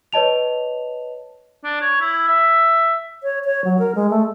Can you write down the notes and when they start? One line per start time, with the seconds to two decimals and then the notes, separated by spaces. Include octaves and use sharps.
0.13 B4 C#5 D#5 A5 F7
1.64 D4
1.81 C#5
2.01 E4
2.28 E5
3.23 C#5
3.44 C#5
3.65 F#3
3.79 A#4
3.95 G#3
4.10 A3